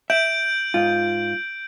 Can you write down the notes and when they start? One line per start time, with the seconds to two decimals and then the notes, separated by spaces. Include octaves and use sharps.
0.10 E5 G6 D7 F#7
0.74 G#2 F4